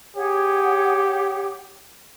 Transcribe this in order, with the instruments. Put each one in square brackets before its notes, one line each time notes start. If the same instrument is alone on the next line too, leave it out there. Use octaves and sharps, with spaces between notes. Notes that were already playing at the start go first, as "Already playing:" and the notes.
[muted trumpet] G4 [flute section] G#4 C#5 F#5